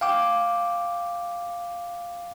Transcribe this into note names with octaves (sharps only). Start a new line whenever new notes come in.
F5 G5 D6